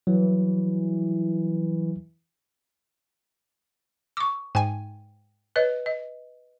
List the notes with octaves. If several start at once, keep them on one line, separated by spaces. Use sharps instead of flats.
E3 F#3
C#6 D6 E6
G#2 G5 G#5
B4 C#5 D#5
D#5